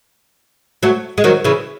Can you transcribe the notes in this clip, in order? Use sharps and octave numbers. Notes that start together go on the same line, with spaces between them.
F#3 A3
G#3
D#3 F#3
C#3 E3